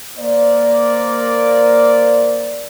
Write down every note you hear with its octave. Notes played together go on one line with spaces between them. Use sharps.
A#3 A#4 C5 D5